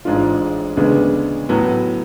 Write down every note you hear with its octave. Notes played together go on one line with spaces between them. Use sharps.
A1 G#2 G#3 D4 F4
D2 C#3 G#3 B3 D4
A2 F#3 B3